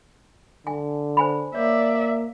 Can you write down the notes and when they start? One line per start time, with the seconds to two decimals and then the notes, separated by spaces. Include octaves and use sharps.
0.67 D3 G#5
1.17 C5 G#5 B5
1.55 A#3 C#5 D5 E5